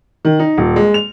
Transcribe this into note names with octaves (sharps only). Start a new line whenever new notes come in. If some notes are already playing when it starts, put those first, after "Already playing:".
D#3
D#4
D#1
G#3
F7